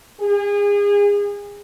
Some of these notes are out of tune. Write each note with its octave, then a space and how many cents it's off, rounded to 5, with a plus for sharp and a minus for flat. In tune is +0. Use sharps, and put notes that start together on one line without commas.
G#4 -30